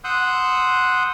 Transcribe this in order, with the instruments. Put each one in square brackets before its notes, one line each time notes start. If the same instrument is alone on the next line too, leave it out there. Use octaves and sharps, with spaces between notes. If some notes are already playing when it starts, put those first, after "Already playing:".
[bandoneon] F#5 C6 D#6 E6 F#6 G6